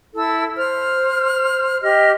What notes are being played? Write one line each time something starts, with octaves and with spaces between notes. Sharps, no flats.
E4 A4 E6
C5 F6
G4 D#5 F6